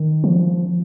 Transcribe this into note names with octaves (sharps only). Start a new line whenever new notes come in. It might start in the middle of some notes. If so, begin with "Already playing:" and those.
Already playing: D#3
F3